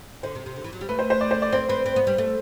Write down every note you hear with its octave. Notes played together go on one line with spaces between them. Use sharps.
D3 C5
C3
C3
D3
E3
F#3
G3
A3 B4
C5
C5
D5
C5
D5
C4 C5
C4 B4
C4 B4
B3
G3
A3